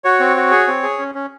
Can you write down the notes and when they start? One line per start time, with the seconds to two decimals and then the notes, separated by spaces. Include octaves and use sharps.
0.04 F#4 C#5
0.20 C4
0.36 F#4
0.51 G#4
0.67 C4
0.83 G#4
0.99 C#4
1.15 C#4